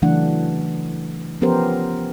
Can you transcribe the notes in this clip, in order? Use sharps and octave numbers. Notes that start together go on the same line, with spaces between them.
C#3 E3 F#3 A3 D4 F#5
F3 B3 C#4 G4 A#4 C5